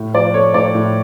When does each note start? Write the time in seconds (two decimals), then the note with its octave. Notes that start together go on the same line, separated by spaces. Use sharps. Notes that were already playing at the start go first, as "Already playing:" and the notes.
Already playing: A2
0.13 F3 D5
0.34 A3 C#5
0.54 A2 D5
0.75 A2